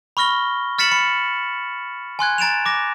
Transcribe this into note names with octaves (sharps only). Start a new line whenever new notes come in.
B5 C#6 F6 A#6 G7
F6 A6 B6 C#7 E7 F#7
B5 C#7
G#5 C6 F#6 G#6
A#5 A6 D7 E7 F7
D6 A#6